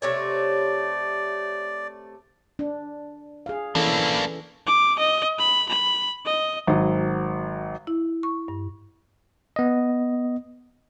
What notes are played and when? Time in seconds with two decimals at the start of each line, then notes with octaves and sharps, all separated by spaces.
0.02 C3 A3 C#5 D5
2.59 D4
3.46 G#4 F5
3.75 E3 A#3 C#4 D4 A4
4.67 D6
4.99 D#5
5.39 B5
5.69 B5
6.26 D#5
6.67 G#1 F#3
7.87 E4
8.23 C#6
8.48 G2
9.56 B3 D#5